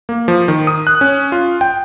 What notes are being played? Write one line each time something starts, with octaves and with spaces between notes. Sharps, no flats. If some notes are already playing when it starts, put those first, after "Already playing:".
A#3
F3
D#3
D#6
F#6
C#4
F4
G5